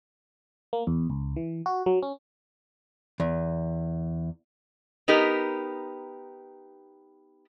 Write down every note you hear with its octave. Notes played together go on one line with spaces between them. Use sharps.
A#3
E2
C#2
E3
F#4
F#3
C#4
E2
B3 D#4 G4 A#4